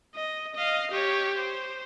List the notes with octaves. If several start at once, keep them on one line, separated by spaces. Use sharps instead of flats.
D#5
D#5 F5
G4 C#5
C5